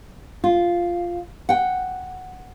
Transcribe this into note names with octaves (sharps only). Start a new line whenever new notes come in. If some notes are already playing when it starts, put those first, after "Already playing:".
F4
F#5 G5